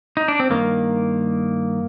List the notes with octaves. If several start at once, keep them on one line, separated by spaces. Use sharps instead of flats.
D#4
D4
C4
G2 D#3 A#3